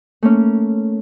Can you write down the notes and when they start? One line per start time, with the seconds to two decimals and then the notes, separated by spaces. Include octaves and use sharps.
0.23 A3 A#3 C#4